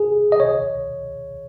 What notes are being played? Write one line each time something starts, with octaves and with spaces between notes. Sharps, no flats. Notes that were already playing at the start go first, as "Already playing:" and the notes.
Already playing: G#4
D#5
C#5